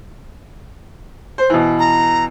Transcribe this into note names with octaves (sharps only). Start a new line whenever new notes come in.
C5
B2 E3
A#5